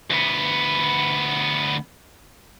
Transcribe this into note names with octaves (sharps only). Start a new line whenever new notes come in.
D2 B3